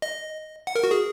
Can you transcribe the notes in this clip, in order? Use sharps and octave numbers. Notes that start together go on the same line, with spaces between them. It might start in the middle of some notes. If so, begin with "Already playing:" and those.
D#5
F#5
A#4
F#4
G#4